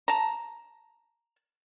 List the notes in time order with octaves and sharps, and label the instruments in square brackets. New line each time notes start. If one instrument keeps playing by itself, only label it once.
[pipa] A5 A#5